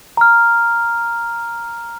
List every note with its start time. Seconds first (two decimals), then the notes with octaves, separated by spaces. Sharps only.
0.17 A#5 F6